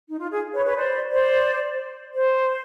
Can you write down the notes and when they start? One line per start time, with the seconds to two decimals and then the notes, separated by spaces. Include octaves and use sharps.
0.09 D#4
0.20 F4
0.31 G#4
0.54 B4 C#5
0.65 B4 C#5
0.77 C5 D5
1.11 C5 D5
2.14 C5